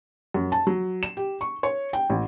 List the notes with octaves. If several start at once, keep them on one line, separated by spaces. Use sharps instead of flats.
F#2
A5
F#3
E7
G4
C#6
C#5
G5
A1